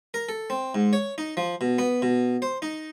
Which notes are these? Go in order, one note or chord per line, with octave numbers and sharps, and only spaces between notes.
A#4
A4
C4
G#2
C#5
D#4
F3
B2
B3
B2
C5
D#4